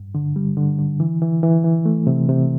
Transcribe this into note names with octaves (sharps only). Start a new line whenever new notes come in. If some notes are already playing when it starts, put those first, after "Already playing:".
Already playing: G2
D3
G3
D3
D3
E3
E3
E3
E3
A3
C3
C3